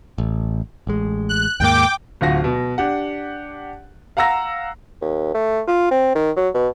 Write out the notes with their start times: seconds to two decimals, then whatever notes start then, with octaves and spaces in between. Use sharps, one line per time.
0.18 A1
0.87 A1 G#3
1.29 F#6
1.60 D#2 G#2 A#3 G5 D6
2.21 D1 D2 F4 F#4 A#6
2.44 B2
2.78 D4 G4 F#5
4.17 F5 F#5 A#5 E6 A#6
5.02 D#2
5.34 A3
5.68 F4
5.91 C4
6.15 D#3
6.37 F#3
6.54 B2